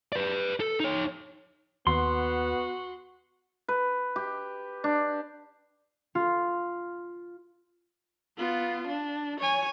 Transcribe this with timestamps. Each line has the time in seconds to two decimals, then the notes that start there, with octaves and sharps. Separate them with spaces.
0.12 B4 D5
0.60 A4
0.80 D#4 C#5
1.87 D#2 B3 F#4 C6
3.68 B4
4.16 G4
4.84 D4
6.15 F4
8.38 B3 F4
8.87 D4
9.40 C#5 G#5